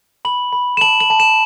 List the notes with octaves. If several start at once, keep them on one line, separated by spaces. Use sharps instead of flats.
B5 F#7
B5
E7
A5 F#7
F#7
A5
E7